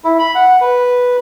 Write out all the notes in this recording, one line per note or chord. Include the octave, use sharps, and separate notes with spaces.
E4
B5
F#5
B4